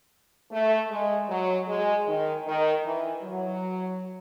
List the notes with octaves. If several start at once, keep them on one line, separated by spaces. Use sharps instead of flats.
A3
G#3
F#3
G#3
D#3
D#3
E3
F#3